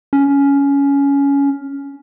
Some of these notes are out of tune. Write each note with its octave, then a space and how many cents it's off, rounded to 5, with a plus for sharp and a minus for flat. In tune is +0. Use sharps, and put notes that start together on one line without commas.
C#4 +15